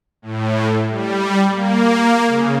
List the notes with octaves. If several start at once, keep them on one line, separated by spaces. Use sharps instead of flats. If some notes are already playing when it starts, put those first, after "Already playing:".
A2
G3
A#3
C#3